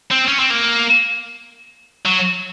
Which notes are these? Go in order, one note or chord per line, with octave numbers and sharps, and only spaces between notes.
C4
C#4
C4
A#3
F#3